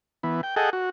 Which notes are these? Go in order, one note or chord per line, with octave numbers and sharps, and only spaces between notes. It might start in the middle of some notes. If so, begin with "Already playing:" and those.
E3 B3
G5
G#4 A4 D#5 F#5 G5
F#4